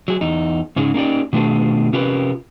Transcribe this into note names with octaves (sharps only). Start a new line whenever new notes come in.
F#3 G#4
E2 D#4
G#2 C#3 C#4 D#4 G#4
A#3 C#4 D#4 G4 D5
B2 D#3 A3 D4 F4 G#4
C3 C#4 F4 G4 A#4 B4